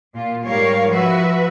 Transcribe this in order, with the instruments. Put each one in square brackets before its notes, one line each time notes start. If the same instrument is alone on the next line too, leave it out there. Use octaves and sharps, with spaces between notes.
[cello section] A#2 F4
G#2 G3 A#4 C#5 F5
F3 F#4 B4 E5